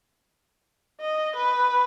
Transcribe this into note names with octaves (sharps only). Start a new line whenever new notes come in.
D#5
B4